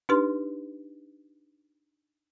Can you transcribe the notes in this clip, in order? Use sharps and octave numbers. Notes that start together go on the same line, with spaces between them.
D4 D#4 G4 B4 C6